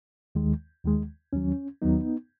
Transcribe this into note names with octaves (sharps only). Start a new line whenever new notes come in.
D#2 D#3 G#3
D#2 D#3 G#3
D#2 D#3 F#3 C#4
D#2 D#3 F#3 B3 D#4